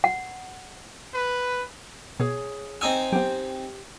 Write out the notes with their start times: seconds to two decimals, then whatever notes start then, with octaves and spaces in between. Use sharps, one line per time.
0.04 F#5
1.14 B4
2.20 B2 G#4 C#5
2.81 C4 D#4 G#5 C#6 D#6 E6
3.12 F#3 B3 G4 C5